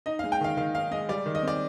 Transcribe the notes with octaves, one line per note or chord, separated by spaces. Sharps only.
D#4 D#5
G#3 F5
G5
D#3 F5
D#3 F5
D#4 F5
G#3 D#5
G3 D5
D#3
D#5
C4 D5